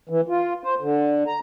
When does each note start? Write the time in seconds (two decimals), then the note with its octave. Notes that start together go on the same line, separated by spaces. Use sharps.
0.09 E3
0.28 F4
0.64 C5
0.80 D3
1.27 A#5